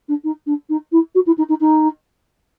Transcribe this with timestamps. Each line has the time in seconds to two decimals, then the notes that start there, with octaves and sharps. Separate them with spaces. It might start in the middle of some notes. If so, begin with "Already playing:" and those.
0.08 D4
0.24 D#4
0.46 D4
0.69 D#4
0.92 E4
1.15 F#4
1.26 E4
1.38 D#4
1.49 D#4
1.60 D#4